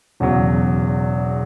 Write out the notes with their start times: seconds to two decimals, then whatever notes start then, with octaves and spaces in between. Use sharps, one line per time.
0.20 E1 E2 C#3 F#3